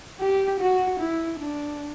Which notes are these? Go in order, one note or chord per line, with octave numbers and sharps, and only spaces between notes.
G4
F#4
E4
D4